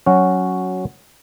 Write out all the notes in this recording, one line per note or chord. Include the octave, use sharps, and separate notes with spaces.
F#3 C#4 F#4